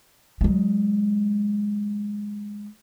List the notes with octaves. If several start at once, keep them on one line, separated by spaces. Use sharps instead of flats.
F#3 G#3